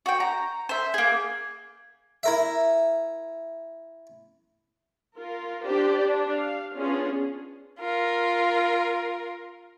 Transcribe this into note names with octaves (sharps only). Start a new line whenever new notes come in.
F#4 G5
A#5
C5 E5
A#3 G#4
E4 A#4 E5
F4 A#4
D4 G4 C5 D5
D4
F5
B3 C#4 D4 F4 G#4
F4 A#4